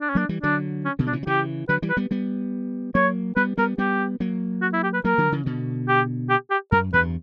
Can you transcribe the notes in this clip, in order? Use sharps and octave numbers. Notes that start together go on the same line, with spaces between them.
D4
C#4
F#3 A#3 D4
E3 G3
D3 F#3 D4
C#4
B2 D3
F#3 D4
C#3 E3
F#3
C#3 E3 G4
D3 F#3 B4
E3 G3
B4
G3 B3
G3 B3
F#3 A#3 C#5
G3 B3 B4
G3 B3 A#4
G3 B3 G4
F#3 A#3
F#4
E4
G4
B4
F#3 A#3 A#4
D3 F#3
C#3 E3
B2 D3
G4
G4
G4
F#2 A#4
E2 G2 B4